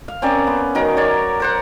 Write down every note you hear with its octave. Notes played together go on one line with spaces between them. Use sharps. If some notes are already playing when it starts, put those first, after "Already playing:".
F5
C4 C#4 A#4 D5
B3
D#3 F#3 A#4
C#5 D5
A#4 C5 F#5